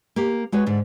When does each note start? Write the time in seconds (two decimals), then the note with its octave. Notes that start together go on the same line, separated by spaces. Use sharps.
0.16 A#3 G4
0.52 G#3 F#4 B4 C#5
0.66 G#2 D3